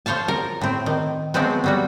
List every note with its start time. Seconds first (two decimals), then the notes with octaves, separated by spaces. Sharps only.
0.06 F3 C5 C#5 F5 A5
0.28 A#4
0.61 A2 C4
0.86 D#3
1.34 F3 F#3 G#3 B3 C4
1.64 F#3 G3 F#4